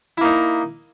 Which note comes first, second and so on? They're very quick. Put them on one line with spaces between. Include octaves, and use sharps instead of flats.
E4 A#3 D#4